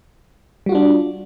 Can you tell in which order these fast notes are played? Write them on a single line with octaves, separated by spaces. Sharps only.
G3 F#4 F4 D4